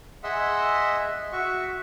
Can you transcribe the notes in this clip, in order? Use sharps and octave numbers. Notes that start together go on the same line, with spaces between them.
G#4 D#5 E5 F#5 C6 E6
F#4 E5 C#6